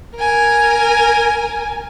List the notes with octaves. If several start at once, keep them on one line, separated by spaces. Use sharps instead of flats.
A#4 G#5